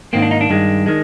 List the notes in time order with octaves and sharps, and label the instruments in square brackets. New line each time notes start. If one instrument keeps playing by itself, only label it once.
[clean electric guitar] G#2 D#3 A#3 C4
D4
D#4
D4
G2 D#3 G#3
D#3 G#3